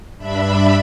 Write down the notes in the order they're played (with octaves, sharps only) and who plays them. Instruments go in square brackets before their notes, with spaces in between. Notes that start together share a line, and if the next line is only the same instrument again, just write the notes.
[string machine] G2 D4 E5 B5